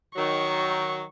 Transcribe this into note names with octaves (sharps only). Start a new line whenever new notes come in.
D#3 F#3 C#6